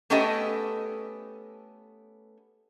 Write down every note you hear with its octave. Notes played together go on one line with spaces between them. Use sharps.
A3 B3 C#4 G4 A4 D#5